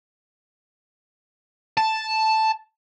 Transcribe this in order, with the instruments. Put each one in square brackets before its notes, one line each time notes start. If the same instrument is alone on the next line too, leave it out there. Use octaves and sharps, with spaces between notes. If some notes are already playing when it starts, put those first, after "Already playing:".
[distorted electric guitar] A5